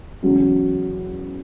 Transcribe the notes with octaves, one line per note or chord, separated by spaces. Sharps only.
E2 C#3 F#3 C#4